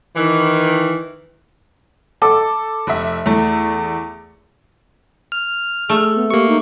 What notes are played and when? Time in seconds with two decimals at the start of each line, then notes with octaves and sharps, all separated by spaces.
0.16 D#3 E3
2.22 A4 D6
2.87 F1 E5
3.26 E2 A3
5.32 F6
5.89 A3 G#4
6.16 B3
6.31 A#3 G4 C#6
6.49 D#4